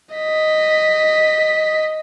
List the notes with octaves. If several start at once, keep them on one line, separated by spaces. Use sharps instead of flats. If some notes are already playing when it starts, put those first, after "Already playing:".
D#5 B6